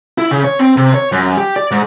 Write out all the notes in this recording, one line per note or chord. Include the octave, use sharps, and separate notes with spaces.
E4
C#3
C#5
C4
C3
C#5
F#2
G4
D5
G#2